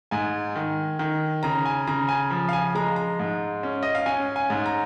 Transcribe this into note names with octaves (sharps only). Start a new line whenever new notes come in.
G#2 G#5
D#3
D#3
C#3 A#5
G#5
C#3 A#5
G#5
F3
F5
G#5
G#3 A#5
A#5
G#2
C#4
D#5
F5
C#4 G#5
G#5
G#2
A#5